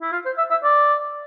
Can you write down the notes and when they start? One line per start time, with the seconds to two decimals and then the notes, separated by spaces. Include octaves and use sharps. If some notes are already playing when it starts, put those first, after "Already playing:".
0.02 E4
0.12 F4
0.26 C5
0.38 E5
0.50 E5
0.64 D5